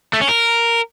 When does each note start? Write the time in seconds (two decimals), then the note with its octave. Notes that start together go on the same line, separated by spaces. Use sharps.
0.13 A3
0.21 C#4
0.29 A#4